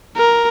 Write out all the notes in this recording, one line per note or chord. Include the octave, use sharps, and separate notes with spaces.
A#4